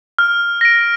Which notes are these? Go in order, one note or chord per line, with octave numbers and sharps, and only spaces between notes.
F6
A#6 D7